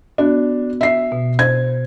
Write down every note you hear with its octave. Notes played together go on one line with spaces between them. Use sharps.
B3 D4 F#4
E5 C7
B2
C5 G#6